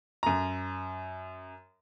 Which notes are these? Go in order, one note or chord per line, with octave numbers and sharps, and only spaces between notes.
F#2 A#5